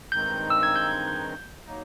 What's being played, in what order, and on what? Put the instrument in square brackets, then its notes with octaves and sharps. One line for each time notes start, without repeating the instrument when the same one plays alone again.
[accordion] G2 D#3 G#3 C4 D#4 [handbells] G6
[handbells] E6
G#6
G6
G#6
G6
[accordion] F#3 A#3 D#4